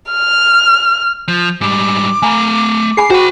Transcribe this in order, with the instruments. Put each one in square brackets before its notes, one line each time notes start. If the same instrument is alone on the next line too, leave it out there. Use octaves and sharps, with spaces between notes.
[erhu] F6
[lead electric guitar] F3 [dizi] G6
[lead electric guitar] G#2 G3 [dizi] D6
[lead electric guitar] A3 F5 [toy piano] G#5 A#5 B5
[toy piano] G#4 G#5 B5 [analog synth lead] C7
[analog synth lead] F#4 [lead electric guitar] C5 B5 [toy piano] G5